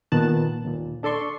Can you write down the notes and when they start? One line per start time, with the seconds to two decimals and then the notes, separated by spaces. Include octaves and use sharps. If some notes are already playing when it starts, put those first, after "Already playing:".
0.12 A#2 D#3 B3 A5 F#6
0.64 D#2 A#2
1.03 D4 A4 D5 C6 C#6